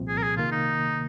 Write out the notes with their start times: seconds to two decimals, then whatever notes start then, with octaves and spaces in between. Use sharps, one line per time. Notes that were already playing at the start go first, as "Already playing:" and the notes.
Already playing: C2 A#2 F3 C4
0.08 G#4
0.18 A#4
0.23 G#4
0.37 C3 D#3 A#3 F4
0.52 D#4